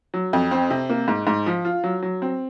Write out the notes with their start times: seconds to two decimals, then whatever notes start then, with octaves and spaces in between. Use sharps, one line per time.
0.14 F#3
0.33 F2
0.51 C4
0.70 C3
0.89 A#3
1.08 G#2
1.27 G#2
1.46 F3
1.65 F4
1.84 F#3
2.03 F#3
2.22 C4